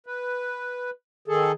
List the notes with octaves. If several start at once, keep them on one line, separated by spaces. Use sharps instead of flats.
B4
D#3 G#4 A4